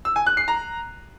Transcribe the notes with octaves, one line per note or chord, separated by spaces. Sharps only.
E6
G#5
F#6
C7
A#5